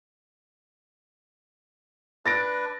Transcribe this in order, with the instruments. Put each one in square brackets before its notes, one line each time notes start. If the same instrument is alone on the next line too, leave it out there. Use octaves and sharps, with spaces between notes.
[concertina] D4 B4 [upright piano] A6 A#6 D7